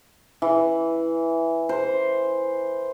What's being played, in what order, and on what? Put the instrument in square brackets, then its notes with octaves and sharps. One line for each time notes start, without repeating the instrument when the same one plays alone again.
[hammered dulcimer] E3
C5